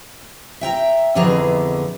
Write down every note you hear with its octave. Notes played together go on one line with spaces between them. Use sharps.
E5 G5 A#5
F2 B2 D3 E3 G#4 A#5